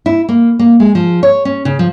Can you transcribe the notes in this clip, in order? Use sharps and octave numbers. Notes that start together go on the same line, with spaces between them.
E4
A#3
A#3
G#3
F3
C#5
C#4
C#3
F3